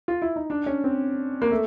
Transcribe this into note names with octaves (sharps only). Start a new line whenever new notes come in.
F4
E4
D#4
D4
C#4
C4
A#3
A3